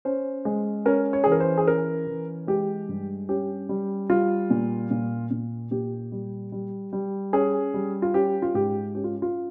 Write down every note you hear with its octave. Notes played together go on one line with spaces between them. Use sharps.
C#4 C5
G#3
C#4 A#4
C#5
E3 G#4
A#4
C5
G#4
C#4 A#4
E3
G#3 G4
G2
C#4 G4
G3
G3 F4
A#2
A#2
A#2
A#2 G4
G3
G3
G3
C#4 G#4
G3
F4
C#4 G4
F4
G#2 G4
C#4 G4
F4
F4